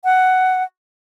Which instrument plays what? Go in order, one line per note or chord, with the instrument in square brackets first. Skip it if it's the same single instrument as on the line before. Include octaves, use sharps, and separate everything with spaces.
[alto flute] F#5